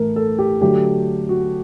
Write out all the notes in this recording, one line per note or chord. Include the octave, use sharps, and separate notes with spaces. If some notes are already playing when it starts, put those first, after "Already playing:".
Already playing: A2 E3 A3 A#4
A4
G4
D3 F#3 A3 G4
F#4